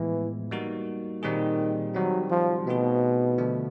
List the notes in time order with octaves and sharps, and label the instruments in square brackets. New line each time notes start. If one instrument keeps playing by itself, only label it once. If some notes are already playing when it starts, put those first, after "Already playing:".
Already playing: [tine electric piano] A2 F3 G#3 B3 [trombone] E3
[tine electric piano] G3 A#3 D#4 F#4 A#4
[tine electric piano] A#2 G3 C4 D#4 G#4 [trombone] D#3
[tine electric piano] D#3 G3 C4 [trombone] F#3
[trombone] F3
[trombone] B2 [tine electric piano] A3 C4 D#4 G#4
[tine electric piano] D3 F3 A3 D4